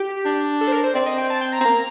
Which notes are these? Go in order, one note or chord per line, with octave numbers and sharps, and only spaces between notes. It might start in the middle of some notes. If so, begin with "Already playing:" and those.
Already playing: G4
D4
A4
C5
A#4
C5
C4 D5
D#5
G5
A5
G5
A#5
C4
A#3